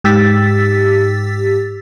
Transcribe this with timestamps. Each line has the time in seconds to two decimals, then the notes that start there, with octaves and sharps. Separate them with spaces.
0.04 G#2 G4 E6 A6 B6